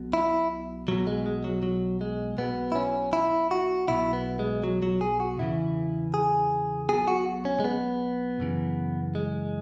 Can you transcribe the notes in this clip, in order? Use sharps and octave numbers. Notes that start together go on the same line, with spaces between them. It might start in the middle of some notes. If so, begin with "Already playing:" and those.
Already playing: B1 B2
E4
B1 B2 F#3
G#3
G#3
F#3
F#3
G#3
B1 B2 B3
E4
C#4
E4
F#4
B1 B2 E4
B3
G#3
F#3
F#3
G#4
F#4
E2 C#3 E3 E4
G#4
B1 B2 G#4
F#4
C#4
G#3
B3
F#2 C#3 E3
G#3